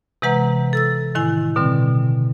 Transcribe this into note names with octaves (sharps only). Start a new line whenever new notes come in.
C3 E3 G#3 B4 F#5 A#5
A4 E6 A6
A2 D#3 E4 G#5
B2 D3 G3 C4